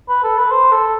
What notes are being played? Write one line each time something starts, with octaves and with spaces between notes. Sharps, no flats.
B4
A4
B4
C5
A4